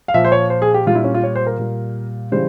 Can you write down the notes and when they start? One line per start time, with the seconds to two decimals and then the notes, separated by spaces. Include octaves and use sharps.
0.08 F5
0.14 A#2 F3 E5
0.25 C5
0.32 C#5
0.50 C5
0.62 G#4
0.74 G4
0.87 A#2 G3 F4
0.95 E4
1.04 C#4
1.14 F4
1.24 C#5
1.35 C5
1.47 A#4
1.59 A#2 G3
2.32 C#3 E3 G3 C5